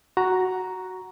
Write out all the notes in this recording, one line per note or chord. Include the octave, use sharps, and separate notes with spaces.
F#4 A#5